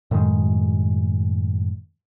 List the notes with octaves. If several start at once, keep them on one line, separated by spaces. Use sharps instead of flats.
F#2 A2 D#3 G#3